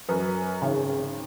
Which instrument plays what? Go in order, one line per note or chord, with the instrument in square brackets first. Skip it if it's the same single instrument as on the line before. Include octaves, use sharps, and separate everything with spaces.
[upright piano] F#2 B4
[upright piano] G#1 [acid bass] C#3